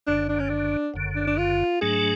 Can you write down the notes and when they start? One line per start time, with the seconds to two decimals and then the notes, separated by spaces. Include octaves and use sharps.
0.07 F#1 F#2 D3 D4
0.29 D4
0.40 C#4
0.49 D4
0.94 F#1 F#2 D3
1.16 D4
1.27 D4
1.38 F4
1.81 G#2 F#3 A3 D4 G#4